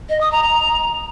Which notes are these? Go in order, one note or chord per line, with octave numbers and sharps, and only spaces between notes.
D#5
D#6
A#5
A#5